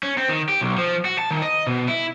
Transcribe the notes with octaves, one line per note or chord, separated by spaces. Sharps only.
C#4
C4
D#3
G4
B1
F3
F#4
A5
D#3
D#5
B2
E4